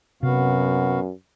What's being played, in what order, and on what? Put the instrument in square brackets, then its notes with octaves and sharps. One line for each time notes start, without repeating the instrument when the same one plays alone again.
[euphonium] F#2 [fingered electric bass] C3 [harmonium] B3 F#4 F5